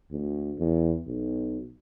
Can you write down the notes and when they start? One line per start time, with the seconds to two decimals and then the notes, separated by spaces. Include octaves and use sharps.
0.11 D2
0.59 E2
1.07 B1